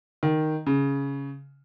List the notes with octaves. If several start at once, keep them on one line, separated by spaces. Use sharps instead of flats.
D#3
C#3